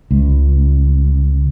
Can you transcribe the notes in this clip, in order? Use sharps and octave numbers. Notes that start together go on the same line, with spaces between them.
C#2